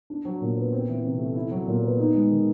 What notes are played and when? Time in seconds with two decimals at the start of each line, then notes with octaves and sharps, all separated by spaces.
0.10 D4
0.25 F#3
0.41 A#2
0.57 B3
0.73 C4
0.89 E3
1.04 C3
1.19 A3
1.36 E4
1.51 F#3
1.67 A#2
1.83 B3
1.99 D#4
2.14 G#3
2.30 D#3